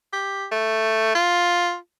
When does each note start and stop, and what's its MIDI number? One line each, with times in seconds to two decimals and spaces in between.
0.13 0.47 67
0.52 1.15 57
1.15 1.76 65